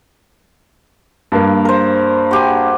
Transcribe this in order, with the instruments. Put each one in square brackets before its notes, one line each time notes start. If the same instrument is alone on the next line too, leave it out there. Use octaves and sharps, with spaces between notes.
[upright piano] G2 A#3
[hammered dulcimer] A#4 C5
F#4 G4 G#5